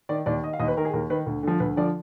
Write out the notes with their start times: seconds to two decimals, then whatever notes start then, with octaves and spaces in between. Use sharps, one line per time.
0.09 D#3 D5
0.26 D#2 D5
0.43 D#3 D#5
0.53 F5
0.60 D#2 D#5
0.68 B4
0.77 D#3 A#4
0.85 G#4
0.93 D#2 A#4
1.10 D#3 B4
1.26 D2
1.43 D3 F3
1.60 D2 B4
1.76 D3 F3 D5